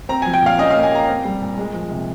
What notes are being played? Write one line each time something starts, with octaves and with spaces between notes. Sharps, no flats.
C4 A#5
F3 G#5
G5
A#2 F5
C#4 D#5
A#3 F5
G#5
G4 A#5
C4
G3
A#2
G#3
F3
C3